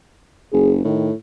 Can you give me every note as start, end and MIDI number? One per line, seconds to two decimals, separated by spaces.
0.53 0.80 30
0.53 0.73 68
0.84 1.13 45
0.84 1.09 51